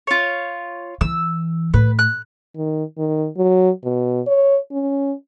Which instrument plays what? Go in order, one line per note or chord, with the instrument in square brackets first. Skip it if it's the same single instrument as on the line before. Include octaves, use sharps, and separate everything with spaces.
[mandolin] F4 C#5
[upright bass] E3 [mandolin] E6
[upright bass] A2 [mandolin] B4
[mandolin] F#6
[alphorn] D#3
D#3
F#3
B2
C#5
C#4